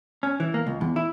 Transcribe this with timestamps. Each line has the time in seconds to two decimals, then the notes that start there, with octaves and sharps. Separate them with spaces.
0.23 C#4
0.40 E3
0.54 A#3
0.67 C#2
0.81 E2
0.96 E4